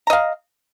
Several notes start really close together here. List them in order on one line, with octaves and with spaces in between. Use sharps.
A#5 D#5 F5